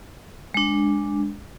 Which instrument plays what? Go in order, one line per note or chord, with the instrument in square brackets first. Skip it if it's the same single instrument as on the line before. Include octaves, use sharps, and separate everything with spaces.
[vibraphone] G#3 D4